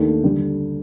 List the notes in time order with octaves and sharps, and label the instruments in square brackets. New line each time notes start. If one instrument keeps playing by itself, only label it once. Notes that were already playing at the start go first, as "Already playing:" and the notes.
Already playing: [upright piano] D#2 D#3 A3 D4
D3 G3